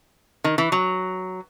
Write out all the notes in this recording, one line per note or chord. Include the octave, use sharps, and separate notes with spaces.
D#3
E3
F#3